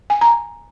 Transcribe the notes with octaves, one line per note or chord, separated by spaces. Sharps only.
G#5
A#5